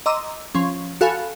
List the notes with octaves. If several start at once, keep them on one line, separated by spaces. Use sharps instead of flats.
D#5 A#5 C6 D6 E6
F3 C#4
F#4 A4 F5 G#5 B5